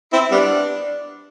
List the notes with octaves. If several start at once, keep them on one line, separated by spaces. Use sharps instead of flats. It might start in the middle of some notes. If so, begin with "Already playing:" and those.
C4 E4
G3 B3 D4